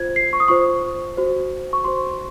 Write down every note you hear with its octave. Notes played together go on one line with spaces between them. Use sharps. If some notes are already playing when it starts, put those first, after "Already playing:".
Already playing: F4 C5 G#6
C7
C#6
D#6
F4 C5 C#6
F#4 C5
C#6
F#4 C5 C6